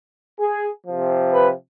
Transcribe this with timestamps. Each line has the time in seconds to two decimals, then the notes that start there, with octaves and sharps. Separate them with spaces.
0.40 G#4
0.86 C3 F3
1.33 B4